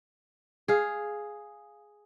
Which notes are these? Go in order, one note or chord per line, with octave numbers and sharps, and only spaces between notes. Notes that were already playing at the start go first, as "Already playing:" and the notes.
G#4 F5